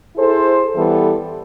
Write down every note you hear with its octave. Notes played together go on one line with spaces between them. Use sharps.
E4 G#4 A4 C5
E3 G3 B3 A4